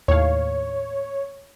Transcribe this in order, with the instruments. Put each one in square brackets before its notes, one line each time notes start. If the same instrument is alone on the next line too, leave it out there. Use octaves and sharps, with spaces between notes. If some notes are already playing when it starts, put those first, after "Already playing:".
[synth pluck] D#2 A2 F5 [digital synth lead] C#5